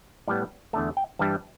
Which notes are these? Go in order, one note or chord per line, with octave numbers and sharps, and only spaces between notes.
A2 G3 B3 D5
E2 D3 A3 A5
G5
G2 E3 G3 E4 A5